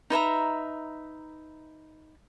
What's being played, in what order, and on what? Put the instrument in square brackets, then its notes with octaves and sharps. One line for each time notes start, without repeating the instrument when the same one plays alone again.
[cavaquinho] D#4 B4 E5 A#5